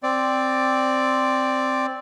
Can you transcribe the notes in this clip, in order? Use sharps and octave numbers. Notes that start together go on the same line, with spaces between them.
C4 D5